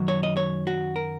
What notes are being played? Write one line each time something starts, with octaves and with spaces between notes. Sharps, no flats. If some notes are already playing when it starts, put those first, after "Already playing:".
Already playing: F#2 D#3 F#3
C#5
D#5
C#5
F#4
A#4